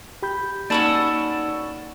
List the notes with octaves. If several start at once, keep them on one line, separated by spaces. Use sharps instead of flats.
G4 B5 G6
A#3 C#4 D#4 F#4 A4 D5 A5 B5